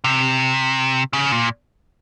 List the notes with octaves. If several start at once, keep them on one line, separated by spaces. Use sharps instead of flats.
C3
C#3
A#2